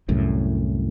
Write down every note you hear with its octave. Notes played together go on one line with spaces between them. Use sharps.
C2 F#2 A2